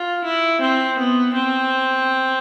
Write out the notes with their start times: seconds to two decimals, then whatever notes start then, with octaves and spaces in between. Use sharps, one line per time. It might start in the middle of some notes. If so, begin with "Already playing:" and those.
Already playing: F4
0.24 E4
0.61 C4
0.98 B3
1.34 C4